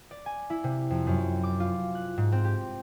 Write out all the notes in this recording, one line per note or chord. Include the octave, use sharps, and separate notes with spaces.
D5
G#5
E4
C3
F2
F#2
D6
F4
F#6
G#2
C4
G4